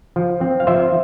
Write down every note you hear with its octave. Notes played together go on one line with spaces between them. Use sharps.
F3
C4
F5
F3 C5 E5